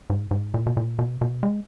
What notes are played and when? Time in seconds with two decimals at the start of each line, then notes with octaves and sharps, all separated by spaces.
0.10 G#2
0.31 G#2
0.54 A#2
0.66 B2
0.77 A#2
0.99 B2
1.21 B2
1.43 G#3